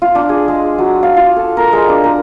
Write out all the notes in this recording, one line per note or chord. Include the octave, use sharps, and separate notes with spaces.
F4
D4
G#4
G#3
F#3
F5
F4
A4
A#4
G#3
D4
A#4